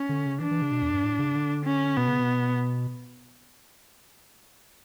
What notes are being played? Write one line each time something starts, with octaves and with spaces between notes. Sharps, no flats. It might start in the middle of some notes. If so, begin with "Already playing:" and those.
Already playing: C#4
D3
C#3
E3 D4
E3
C#3
B2
E2
G2
A2
C#3
D3
C#4
B2 B3
C#3
B2